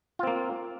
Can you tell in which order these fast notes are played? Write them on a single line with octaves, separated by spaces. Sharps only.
F4 C4 A#3